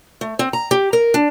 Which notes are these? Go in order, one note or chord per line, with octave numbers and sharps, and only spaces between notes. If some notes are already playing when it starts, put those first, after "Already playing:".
A3
C4
A#5
G4
A#4
D4